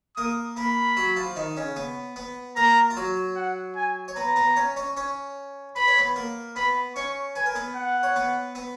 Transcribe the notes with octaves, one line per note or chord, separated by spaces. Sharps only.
A#3 A#4 D#6
A#3 A#4 B5
F#3 F#4
F3 F4
D#3 D#4
C#3 C#4
B3 B4
B3 B4
A#3 A#4 A#5
F4
F#3 F#4
F#5
G#5
C#5
B3 B4 A#5
B3 B4
C#4 C#5
C#4 C#5
C#4 C#5
B4 B5
C#5
B3 B4
A#3 A#4
B3 B4 B5
C#4 C#5 C#6
B4 G#5
A#4
B3 B4
F#5
C#5
B3 B4
B3 B4